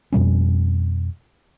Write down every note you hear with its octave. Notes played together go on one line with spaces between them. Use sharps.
F2 B2 G3 C#4